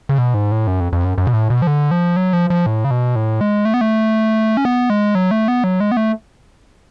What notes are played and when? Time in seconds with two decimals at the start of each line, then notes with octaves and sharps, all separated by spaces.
0.09 C#3
0.18 B2
0.34 G#2
0.52 A2
0.67 F#2
0.80 F2
0.93 F2
1.05 F#2
1.18 F#2
1.27 B2
1.33 A2
1.50 B2
1.62 F3
1.67 D3
1.91 F3
2.17 F#3
2.33 F3
2.50 F3
2.66 A2
2.84 C#3
2.91 B2
3.16 A2
3.41 G#3
3.65 A3
3.74 B3
3.81 A3
4.57 C#4
4.65 B3
4.90 G#3
5.15 F#3
5.31 A3
5.48 B3
5.64 F#3
5.80 G#3
5.91 B3
5.97 A3